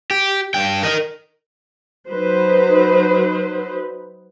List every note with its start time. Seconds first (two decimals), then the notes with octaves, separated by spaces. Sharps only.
0.11 G4
0.54 G2 G5
0.83 A#4 D#5
2.10 F#3 D#4 B4 C5